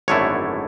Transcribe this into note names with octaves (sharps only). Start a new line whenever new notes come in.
G#1 F#2 D3 A3 E4 C#5